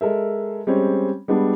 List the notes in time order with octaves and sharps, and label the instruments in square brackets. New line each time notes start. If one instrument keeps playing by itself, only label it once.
[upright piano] G#3 A4 A#4 E5
G3 G#3 C4 C#4
G3 G#3 B3 D4